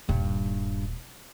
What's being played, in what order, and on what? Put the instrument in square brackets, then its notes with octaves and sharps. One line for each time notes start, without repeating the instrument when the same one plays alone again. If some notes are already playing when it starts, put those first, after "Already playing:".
[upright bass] D#1 [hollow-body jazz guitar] G2